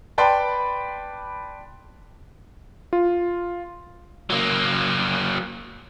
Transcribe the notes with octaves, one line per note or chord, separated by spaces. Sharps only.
B4 D5 G5 A5 B5 C6
F4
F#3 A#3